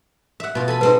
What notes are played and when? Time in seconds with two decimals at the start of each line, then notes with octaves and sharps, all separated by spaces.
0.40 E5 F#5
0.55 B2 F4
0.68 A4 G#5 B5
0.81 G#3 C4 D#4 B4